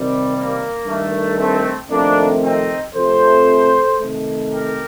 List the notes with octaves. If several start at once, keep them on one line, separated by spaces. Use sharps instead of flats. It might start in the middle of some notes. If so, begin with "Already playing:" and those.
Already playing: C3 D#3 G3
A#3
G2 D#3 A3
A3 C4
F2 C3 D#3 A3 A#3 D4
C4 D#4
F2 C3 F3 A3 A4 C5
C3 D#3 A3
G4 A#4